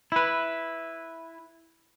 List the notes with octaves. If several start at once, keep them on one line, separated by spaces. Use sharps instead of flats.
E4 B4